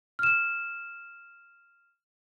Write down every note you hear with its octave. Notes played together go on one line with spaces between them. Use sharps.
F6 E7